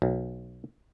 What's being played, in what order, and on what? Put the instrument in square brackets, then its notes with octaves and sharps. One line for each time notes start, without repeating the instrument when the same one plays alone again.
[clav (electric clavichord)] B1